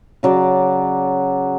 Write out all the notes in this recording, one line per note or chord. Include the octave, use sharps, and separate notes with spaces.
C#3 F#3 D5